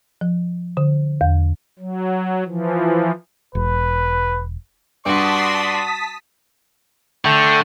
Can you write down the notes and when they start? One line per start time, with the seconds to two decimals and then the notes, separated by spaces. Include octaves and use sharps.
0.21 F3
0.77 D3
1.21 E2
1.79 F#3
2.45 E3 F3
3.55 E1 B4
5.06 G2 F#4 D5 A5 C6 D#6 B6
7.25 D3 A3 G5